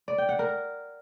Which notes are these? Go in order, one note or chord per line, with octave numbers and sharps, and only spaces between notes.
D5
G5
F#5
A#4